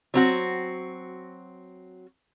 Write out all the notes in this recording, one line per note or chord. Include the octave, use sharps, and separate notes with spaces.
F#3 C4 F#4